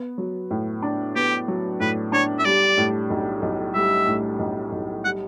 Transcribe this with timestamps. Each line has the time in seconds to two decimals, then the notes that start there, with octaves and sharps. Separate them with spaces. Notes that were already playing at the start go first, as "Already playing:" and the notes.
Already playing: B3
0.18 F#3
0.51 A2
0.83 D4
1.16 B3 G4
1.48 F#3
1.80 A2 B4
2.12 D4 C#5
2.39 E5
2.45 G3 D5
2.78 A2
3.10 B1
3.42 B1
3.75 G3 E5
4.07 A2
4.39 B1
4.72 B1
5.04 G3 F#5